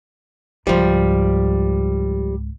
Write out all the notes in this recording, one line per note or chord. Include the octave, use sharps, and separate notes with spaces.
C#2 G#2 F3 G3